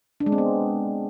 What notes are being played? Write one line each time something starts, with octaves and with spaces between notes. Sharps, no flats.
D4
G#3
C4
B3